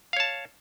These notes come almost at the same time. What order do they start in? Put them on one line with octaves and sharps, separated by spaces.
F5 C#5 A5